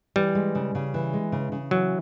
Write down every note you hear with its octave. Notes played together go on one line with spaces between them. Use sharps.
E3 G3
G#3
C#3
C#3
E3
G#3
C#3
C#3
E3 F#3